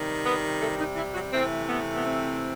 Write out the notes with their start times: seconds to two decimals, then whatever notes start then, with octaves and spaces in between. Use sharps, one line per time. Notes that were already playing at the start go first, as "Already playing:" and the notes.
Already playing: C3 D#3 G3
0.23 B3 B4
0.59 A3 A4
0.77 D#3 D#4
0.95 E3 E4
1.14 F#3 F#4
1.32 C3 E3 A3 C4
1.68 B3
1.96 B3
2.03 C4